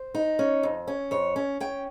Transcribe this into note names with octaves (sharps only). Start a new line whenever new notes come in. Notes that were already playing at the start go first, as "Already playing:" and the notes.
Already playing: C5
D#4
C#4
F2
C#4
F2 C#5
C#4
C#4 G5